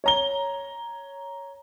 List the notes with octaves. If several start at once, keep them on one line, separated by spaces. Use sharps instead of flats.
C#5 A#5 G7